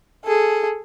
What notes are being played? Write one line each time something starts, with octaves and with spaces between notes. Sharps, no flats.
G#4 A4